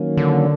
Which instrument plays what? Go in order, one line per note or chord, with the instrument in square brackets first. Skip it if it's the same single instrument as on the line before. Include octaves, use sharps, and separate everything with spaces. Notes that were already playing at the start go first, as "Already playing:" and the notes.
Already playing: [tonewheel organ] D#3 F#3 A#3 C#4
[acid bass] D3